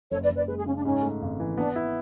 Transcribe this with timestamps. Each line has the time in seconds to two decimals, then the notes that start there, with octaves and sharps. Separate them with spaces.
0.11 F#1 A4 C#5
0.23 B4 D5
0.30 F#1
0.36 B4 D5
0.48 G#3 B4
0.58 G#4
0.66 C#3 C#4
0.76 D4
0.85 G#2 C#4
1.02 A3
1.22 G#1
1.40 E3
1.57 B3 D4
1.76 E4